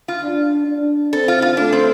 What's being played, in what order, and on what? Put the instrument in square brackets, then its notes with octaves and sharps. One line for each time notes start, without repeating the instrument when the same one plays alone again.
[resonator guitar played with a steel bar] F4
[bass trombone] D4
D4
[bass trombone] C4 [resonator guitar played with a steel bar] A4
[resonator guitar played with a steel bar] F4
F4
[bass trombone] A3 [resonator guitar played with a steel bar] D4
[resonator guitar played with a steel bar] C4